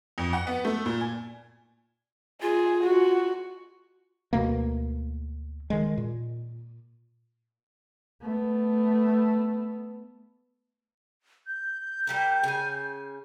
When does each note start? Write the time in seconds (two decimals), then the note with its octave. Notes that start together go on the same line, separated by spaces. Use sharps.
0.18 F2
0.33 F#5
0.47 B3
0.64 A3
0.86 A#2
1.01 G#5
2.42 F4 G#4
2.84 F#4
4.33 D2 B2 A3 A#3
5.70 D#3 G#3
5.97 A#2
8.22 A3 B3
11.47 G6
12.07 G3 G4 A#4
12.44 C#3 G#5